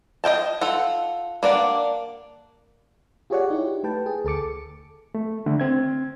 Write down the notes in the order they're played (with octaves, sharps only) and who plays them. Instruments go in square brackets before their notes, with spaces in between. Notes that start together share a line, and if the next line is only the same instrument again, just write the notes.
[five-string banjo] D#5 F5 G5 A5
F4 A4 F#5
A#3 D4 D5 F#5
[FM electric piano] F4 G4 G#4 C#5 D5 F#5
D#4 E4 G4
A3 B4 G5 A5
G#4
D2 A4 A5 D6 C#7
[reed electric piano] A3
D3 A3
C4 G#6